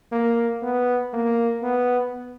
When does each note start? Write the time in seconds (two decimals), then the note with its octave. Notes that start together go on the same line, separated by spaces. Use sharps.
0.12 A#3
0.63 B3
1.13 A#3
1.63 B3